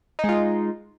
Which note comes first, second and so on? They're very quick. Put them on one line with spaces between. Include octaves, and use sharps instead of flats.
D#4 G#3 F4